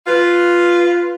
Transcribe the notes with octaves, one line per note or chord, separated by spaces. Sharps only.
F4 B4